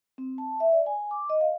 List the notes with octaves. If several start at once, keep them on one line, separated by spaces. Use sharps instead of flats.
C4
A5
E5
D5
G#5
D6
D#5
F5